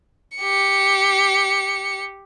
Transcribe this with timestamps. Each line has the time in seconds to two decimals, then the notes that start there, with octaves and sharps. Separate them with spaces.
0.38 G4 C#7